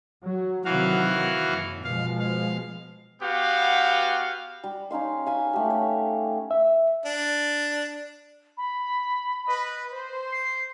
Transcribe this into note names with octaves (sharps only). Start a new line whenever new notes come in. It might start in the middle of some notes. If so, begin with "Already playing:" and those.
F#3
C3 D#3 E3 F#3 F#4 F5
F#1 F#2
B2 F3 G#3 F5
F5
B3 F#4 G4 F5
G3
C#4 D#4 F5 C6
F5 G#5 B5
A3 G4
C#5
E5
D4
B5
B4 D#5
C5
C7